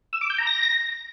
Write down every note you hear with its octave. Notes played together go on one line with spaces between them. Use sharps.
E6
D6
G6
A#5
A#6